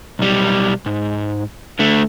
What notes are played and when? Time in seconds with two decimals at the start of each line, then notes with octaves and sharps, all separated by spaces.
0.19 B1 G3
0.86 G#2
1.79 D3 A3